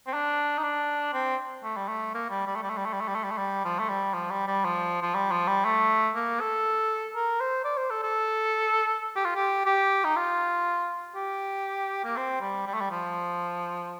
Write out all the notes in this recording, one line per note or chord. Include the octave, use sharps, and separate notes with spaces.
C4
D4
D#4
D4
C4
A3
G3
A3
A#3
G3
G3
A3
G3
A3
G3
A3
G3
A3
G3
A3
G3
A3
G3
F3
A3
G3
F3
G3
G3
F3
F3
G3
F3
G3
A3
A#3
A4
A#4
C5
D5
C5
A4
A4
G4
F4
G4
G4
D#4
F4
G4
A#3
C4
G3
G3
A3
G3
F3